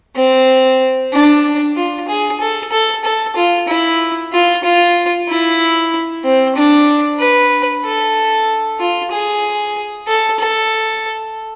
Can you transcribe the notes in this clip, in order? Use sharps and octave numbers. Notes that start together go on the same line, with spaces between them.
C4
D4
F4
G#4
A4
A4
A4
F4
E4
F4
F4
E4
C4
D4
B4
A4
F4
G#4
A4
A4